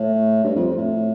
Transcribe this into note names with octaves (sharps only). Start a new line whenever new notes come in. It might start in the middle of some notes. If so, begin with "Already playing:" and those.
Already playing: A2
G2
F2
F2
A2